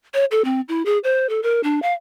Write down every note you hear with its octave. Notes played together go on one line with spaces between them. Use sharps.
C#5
A4
C4
E4
G#4
C5
A4
A#4
D4
F5